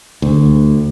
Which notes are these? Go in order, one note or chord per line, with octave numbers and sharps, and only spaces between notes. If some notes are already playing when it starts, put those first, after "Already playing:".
D2